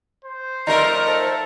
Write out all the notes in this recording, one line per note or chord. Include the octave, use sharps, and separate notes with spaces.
C5
F3 A3 D#4 A#4 D5
A4 C5